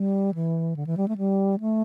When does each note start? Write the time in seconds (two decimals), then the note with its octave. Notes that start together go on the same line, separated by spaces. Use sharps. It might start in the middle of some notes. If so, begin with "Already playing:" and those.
Already playing: G3
0.34 E3
0.76 D3
0.86 E3
0.97 G3
1.08 A3
1.17 G3
1.60 A3